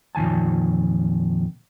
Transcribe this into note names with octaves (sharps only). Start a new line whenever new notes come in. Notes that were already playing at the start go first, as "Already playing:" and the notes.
F2 A#2 D#3 G#5 A5